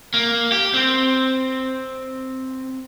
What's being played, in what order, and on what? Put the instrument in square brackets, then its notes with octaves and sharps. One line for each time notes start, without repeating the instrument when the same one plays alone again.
[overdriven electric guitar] A#3
G4
C4